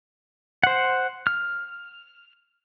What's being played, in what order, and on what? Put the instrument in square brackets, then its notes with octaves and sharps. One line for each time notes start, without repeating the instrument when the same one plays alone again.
[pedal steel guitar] C5 F#5
F6